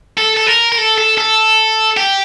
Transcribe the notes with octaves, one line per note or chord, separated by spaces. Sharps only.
A4
A4
A#4
A#4
A4
A4
A4
G4